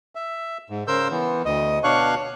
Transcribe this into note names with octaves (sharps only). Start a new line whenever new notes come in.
E5
G#2
C#3 A#4 C5 E6 G6
E3 B3
D2 D#5
B2 D4 C#5 F5 C#6 F#6